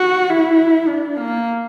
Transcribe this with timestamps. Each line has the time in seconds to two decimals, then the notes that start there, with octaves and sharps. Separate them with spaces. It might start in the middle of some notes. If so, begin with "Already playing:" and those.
Already playing: F#4
0.30 E4
0.88 D4
1.17 A#3